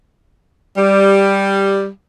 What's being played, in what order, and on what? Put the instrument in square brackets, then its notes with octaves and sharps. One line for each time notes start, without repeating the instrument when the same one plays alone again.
[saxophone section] G3